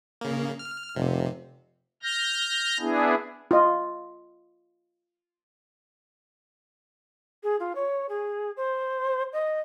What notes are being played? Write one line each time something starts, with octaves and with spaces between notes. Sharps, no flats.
C#3 A#3
F6
F1 C3
F6 G6 A#6
B3 D4 E4 G#4
F4 D#5
G#4
F4
C#5
G#4
C5
D#5